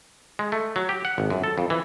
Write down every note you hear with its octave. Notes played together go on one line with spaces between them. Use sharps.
G#3
A3
F#3
G4
F#5
G#1
F#2
A4
F2
E3